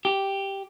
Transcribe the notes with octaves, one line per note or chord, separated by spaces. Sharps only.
G4